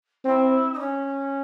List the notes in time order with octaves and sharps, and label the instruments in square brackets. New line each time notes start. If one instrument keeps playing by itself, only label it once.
[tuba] C4 [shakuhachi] E4
[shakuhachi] D#4
C#4